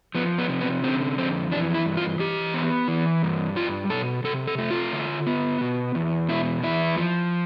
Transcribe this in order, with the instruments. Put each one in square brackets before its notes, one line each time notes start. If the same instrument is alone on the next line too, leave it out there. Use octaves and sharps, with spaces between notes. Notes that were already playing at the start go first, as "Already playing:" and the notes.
[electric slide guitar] F3 B3
B3
C3
B3
D3 C4
F2 C4
E3 D4
E4
G2
F4
E3 G4
B3
E3
G2
G3 F4
B2 A4
C3 A4
A4
A3
F4
D3
B3
B2
E2
B2 E4
E2 E4
F3